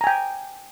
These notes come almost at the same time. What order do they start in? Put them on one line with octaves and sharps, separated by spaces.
A#5 G#5 G5